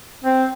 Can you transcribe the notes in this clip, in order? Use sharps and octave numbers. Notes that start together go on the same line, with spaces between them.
C4